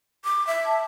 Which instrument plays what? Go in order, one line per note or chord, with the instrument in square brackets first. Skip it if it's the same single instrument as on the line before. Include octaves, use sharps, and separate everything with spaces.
[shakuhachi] D6
E5
[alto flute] A5